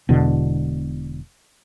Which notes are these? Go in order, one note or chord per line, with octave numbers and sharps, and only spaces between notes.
E1 E2 B2 D3